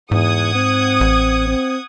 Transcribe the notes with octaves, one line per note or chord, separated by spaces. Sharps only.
E2 G#2 F#5 D#6 G#6
C4
A1
C4